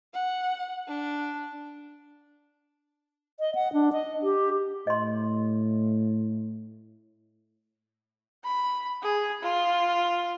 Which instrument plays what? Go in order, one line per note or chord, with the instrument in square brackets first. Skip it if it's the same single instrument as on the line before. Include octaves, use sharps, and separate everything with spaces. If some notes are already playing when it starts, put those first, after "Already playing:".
[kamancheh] F#5
D4
[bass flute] D#5
F#5
D4
D#5
G4
[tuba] A2 [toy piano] D#5 C6
[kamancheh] B5
G#4
F4